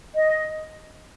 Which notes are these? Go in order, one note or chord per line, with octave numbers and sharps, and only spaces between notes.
D#5